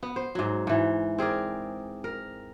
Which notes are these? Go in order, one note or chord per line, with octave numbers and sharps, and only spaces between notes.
B3
C5
G#2 F#3
G#2 E3
C4 G#4 A#4 D5
A#4